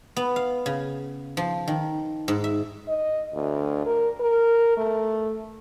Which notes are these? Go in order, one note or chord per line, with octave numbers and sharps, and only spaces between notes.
B3
F5
C#3
F3
D#3
G#2
E5
D#5
D2
A#4
A#4
A3